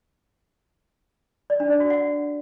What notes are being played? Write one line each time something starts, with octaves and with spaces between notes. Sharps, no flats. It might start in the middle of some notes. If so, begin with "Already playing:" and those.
D5
D4
D5
F#4
F#5